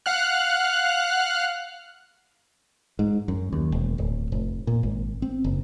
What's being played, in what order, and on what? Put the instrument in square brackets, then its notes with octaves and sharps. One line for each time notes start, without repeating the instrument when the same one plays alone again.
[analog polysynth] F5 F#5 F6 F#6
[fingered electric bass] G#2
F#2
D#2
E1
D1
F1
A#2
G#1
C4
F#1